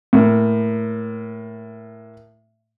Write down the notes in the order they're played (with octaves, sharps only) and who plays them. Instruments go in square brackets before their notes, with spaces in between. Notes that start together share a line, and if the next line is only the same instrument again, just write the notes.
[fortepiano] A2 A#3